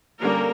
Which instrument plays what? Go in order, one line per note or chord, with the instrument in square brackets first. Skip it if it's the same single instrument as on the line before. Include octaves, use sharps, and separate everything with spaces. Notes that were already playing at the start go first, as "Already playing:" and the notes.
[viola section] D3 G3 A#3 C#4 A#4